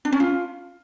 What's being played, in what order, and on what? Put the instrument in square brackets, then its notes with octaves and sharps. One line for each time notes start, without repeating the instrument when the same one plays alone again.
[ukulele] D4
C#4
F4